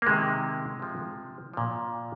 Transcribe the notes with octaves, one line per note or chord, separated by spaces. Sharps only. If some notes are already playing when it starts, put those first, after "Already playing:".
A#3
C3 D#3 G#3
C3 F3
A#2 F3